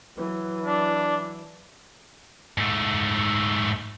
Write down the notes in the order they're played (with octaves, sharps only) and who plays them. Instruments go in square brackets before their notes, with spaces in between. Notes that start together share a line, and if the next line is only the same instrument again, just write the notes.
[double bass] E3 F#3
[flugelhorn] D4
[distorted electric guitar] G#2 A3